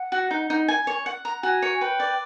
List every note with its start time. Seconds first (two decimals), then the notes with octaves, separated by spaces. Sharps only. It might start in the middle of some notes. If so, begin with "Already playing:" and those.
Already playing: F#5
0.12 F#4
0.31 D#4
0.50 D#4
0.68 G#5
0.87 C#5
1.06 F#5
1.25 A#5
1.43 F#4 G#5
1.62 C#5
1.81 B4 G5
2.00 D5